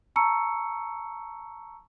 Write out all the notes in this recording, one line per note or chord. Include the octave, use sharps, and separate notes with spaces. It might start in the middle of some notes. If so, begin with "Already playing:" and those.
A5 A#5 C#6 E6 C#7